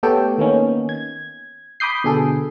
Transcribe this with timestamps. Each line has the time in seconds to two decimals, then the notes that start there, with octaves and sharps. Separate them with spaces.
0.03 A3 B3 G4 A4 C#5 G5
0.38 D#3 A#3 B3 C#4 D#4
0.89 G#6
1.80 B5 D6 D#6 G6 C7
2.04 B2 D3 G#4 A4